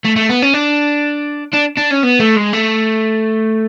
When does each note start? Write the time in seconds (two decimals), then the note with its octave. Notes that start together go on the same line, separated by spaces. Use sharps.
0.05 A3
0.16 A3
0.29 B3
0.42 C#4
0.54 D4
1.54 D4
1.78 D4
1.91 C#4
2.04 B3
2.20 A3
2.37 G#3
2.53 A3